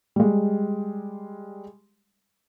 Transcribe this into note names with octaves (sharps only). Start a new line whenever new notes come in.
G3 G#3